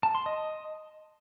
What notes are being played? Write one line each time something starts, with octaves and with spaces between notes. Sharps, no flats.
A5
C6
D#5